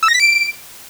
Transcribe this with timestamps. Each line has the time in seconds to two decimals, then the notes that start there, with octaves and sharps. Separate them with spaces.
0.03 E6
0.08 A#6
0.14 B6
0.20 D7